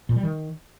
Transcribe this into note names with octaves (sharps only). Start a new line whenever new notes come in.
A#2
G3
D#3